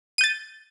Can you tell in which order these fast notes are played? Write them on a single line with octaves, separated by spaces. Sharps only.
D#7 G6 A6